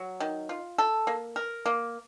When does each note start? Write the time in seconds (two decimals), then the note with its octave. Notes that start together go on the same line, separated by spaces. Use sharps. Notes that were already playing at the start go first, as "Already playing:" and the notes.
Already playing: F#3
0.20 D#3
0.49 F4
0.78 A4
1.07 A#3
1.36 A#4
1.66 A#3